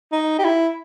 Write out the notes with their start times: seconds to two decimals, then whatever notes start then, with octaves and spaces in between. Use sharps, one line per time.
0.12 D#4
0.39 G4
0.45 E4